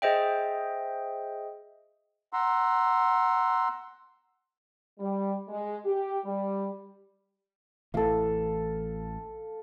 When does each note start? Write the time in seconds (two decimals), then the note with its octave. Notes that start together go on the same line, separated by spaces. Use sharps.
0.02 G#4 C5 D#5 E5 G5
2.33 F#5 A#5 C6 E6
4.99 G3
5.49 G#3
5.84 G4
6.25 G3
7.94 A1 A2 E3 A4 F5